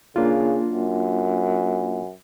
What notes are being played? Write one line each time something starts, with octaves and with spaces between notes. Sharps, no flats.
C#3 A#3 D4 F4
F#2